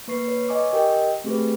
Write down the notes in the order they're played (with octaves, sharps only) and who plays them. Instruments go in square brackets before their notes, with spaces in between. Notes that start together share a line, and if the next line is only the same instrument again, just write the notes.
[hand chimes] A#3 B4 C#6 C7
B4 C#5
D#5 G#5 C#6 D6
G4 A#4 D#5 G5
A3 C4 G4 G#4 B4